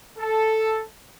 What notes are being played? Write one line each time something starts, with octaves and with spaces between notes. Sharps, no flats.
A4